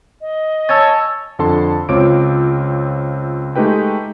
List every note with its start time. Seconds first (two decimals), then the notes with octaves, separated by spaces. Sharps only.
0.21 D#5
0.69 C#5 G#5 A5 E6 G#6 A6
1.39 F2 D3 A4 A5 C6
1.89 C#2 C4 F4 C#5 D6 D7
3.56 G#3 A3 D#4 G4 B4 G5